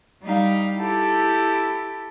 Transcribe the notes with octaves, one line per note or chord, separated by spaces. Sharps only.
G3 D#4 F5
E4 G4 A4